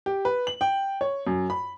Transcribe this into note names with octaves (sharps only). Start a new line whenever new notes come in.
G4
B4
F#7
G5
C#5
F#2
B5